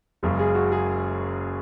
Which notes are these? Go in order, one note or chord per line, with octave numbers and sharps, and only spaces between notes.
F#1 F#2 C#3 G#3 G#4
G#4
F#4
G#4